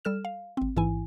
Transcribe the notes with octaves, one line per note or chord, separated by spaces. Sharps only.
G3 A4 F6 E7
F5
G#1 C4
A1 G#2 E3 E4 G#5